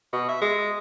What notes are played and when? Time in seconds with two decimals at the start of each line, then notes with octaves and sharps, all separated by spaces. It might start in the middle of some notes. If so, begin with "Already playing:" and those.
0.13 B2
0.29 E5
0.41 G#3